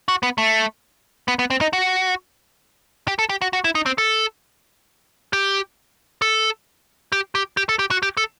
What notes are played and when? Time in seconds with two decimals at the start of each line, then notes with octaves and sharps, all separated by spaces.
0.08 F#4
0.23 B3
0.38 A3
1.28 B3
1.39 B3
1.50 C4
1.61 D#4
1.73 F#4
3.08 G4
3.19 A4
3.29 G4
3.42 F#4
3.53 F#4
3.64 E4
3.75 D#4
3.86 C4
3.98 A4
5.33 G4
6.22 A4
7.12 G4
7.35 G4
7.57 G4
7.69 A4
7.79 G4
7.91 F#4
8.03 G4
8.17 A4